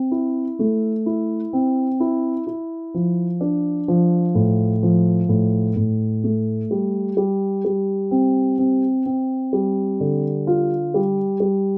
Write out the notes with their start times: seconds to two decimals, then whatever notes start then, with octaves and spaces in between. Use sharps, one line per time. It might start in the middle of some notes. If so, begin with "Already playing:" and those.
Already playing: C4
0.11 E4
0.59 A3
1.06 E4
1.53 C4
2.00 E4
2.47 E4
2.94 F3
3.41 D4
3.88 F3
4.35 A2
4.83 F3
5.29 A2
5.76 A2
6.24 A3
6.71 G3
7.17 G3
7.65 G3
8.11 C4
8.58 C4
9.06 C4
9.53 G3
10.00 D3
10.47 F4
10.94 G3
11.40 G3